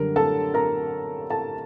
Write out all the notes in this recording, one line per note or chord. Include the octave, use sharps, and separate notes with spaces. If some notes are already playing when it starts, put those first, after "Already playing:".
Already playing: F#2 D3 G3 A#4
A4 A5
A#4 A#5
A4 A5